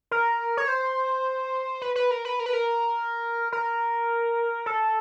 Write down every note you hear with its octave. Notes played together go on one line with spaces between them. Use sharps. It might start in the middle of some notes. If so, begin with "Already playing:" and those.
A#4
C#5
C5
B4
B4
A#4
B4
A#4
B4
A#4
A#4
A4